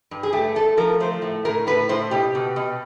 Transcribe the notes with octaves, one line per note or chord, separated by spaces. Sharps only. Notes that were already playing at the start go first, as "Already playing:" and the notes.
G2
G#4
A3 G4
A3 A4
F3 A#4
A3 C5
A2
A2 A#4
A2 B4
A2 C5
B2 G4
B2
B2